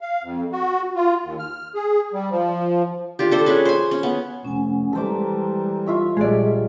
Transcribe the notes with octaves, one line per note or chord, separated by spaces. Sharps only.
F5
F2
F#4
F4
D#2
F6
G#4
G3
F3
D4 F4 G4
D4 A4 C5
C#4 G#4 B4
C5 G#5
C#4
B3
F1 C#4 F#5 G#5
E3 G3 G#3 A4 C5 A#5 D6
F4 E5 C#6
A#1 G3 G#3 G#4 D5 D#5